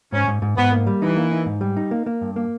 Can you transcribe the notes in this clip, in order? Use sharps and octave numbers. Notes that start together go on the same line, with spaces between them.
G#2 C#4
G#2
G#2
G#2 B3
A#3
G3
E3 D#4
A#3
D#4
G#2
G3
D#4
A#3
A#3
G2
A#3